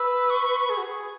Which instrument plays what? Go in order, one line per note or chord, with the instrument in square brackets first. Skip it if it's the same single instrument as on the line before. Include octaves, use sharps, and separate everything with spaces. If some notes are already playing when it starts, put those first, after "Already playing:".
Already playing: [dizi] B4 [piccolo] E6
[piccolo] C#6
[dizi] G#4
F#4
G#4